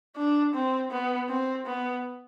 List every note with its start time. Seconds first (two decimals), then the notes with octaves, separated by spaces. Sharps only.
0.16 D4
0.54 C4
0.91 B3
1.29 C4
1.66 B3